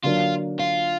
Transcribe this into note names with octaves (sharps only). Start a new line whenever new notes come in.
D3 F#3 A#3 D4 F4
F4